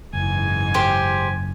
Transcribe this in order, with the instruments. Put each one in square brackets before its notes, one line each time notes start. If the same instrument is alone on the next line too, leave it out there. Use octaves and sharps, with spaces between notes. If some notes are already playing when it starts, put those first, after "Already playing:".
[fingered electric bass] F#1 [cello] G#2 E3 [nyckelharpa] G#5
[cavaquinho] G4 C5